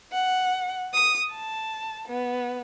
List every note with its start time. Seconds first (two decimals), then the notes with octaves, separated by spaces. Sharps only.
0.12 F#5
0.93 D#6
1.32 A5
2.08 B3